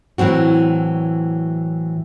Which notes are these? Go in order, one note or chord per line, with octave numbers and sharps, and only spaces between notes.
A2 E3 F#3 C4 F#4